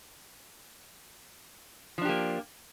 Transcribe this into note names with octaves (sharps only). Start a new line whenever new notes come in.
F3 A#3 D4 G4